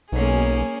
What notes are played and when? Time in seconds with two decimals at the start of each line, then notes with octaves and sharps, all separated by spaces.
0.12 B1 A#3 C#4 G#4